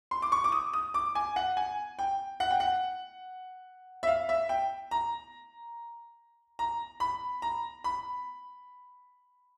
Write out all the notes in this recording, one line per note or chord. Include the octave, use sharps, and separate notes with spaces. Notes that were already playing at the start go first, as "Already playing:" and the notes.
C6
D6
C#6
D6
D#6
D#6
D6
G#5
F#5
G#5
G5
F#5
G5
F#5
E5
F5
E5
G5
A#5
A#5
B5
A#5
B5